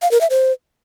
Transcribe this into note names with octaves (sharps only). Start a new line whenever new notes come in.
F5
A#4
E5
C5